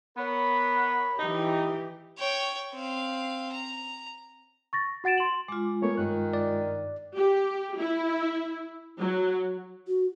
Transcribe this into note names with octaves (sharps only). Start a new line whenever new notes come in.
B3 A#4 C#5 B5
E3 D#4 G4
C#5 G5
C4 F5
A#5
C#6 A6 A#6
F#4 F#5 A6 D7 E7
C6 F#7
G#3 F4 D6
A3 B3 A#4 C#5
G2 D#3 F#6
D5
G4
E4
F#3
F#4